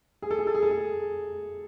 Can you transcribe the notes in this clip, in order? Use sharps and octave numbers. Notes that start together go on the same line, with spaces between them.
G#4
A4
G#4
A4
G#4
A4
G#4